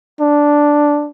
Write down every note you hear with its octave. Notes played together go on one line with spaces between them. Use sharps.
D4